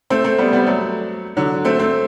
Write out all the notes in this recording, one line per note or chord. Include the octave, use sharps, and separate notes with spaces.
A3 C4
A3 C4
G3 B3
G3 B3
F#3 A3
D3 F#3
A3 C4
A3 C4